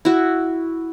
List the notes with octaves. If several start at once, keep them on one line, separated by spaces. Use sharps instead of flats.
E4 F#4